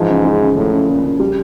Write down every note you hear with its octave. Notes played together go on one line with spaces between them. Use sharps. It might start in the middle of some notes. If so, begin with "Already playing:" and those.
Already playing: G#2 E3 F3
C#3
G#3
C#3
A2 F3
C#3
A#2 C#3
C#3
G3